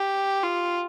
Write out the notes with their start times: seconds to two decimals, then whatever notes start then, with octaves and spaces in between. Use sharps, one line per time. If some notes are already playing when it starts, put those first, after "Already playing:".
Already playing: G4
0.43 F4